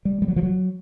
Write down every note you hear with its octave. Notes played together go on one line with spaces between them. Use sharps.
G3
G3
F#3
F3
F#3